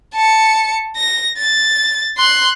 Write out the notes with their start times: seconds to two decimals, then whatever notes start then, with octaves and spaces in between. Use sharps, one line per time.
0.14 A5 C#7
0.96 A#6
1.38 A6
2.17 C6 F#6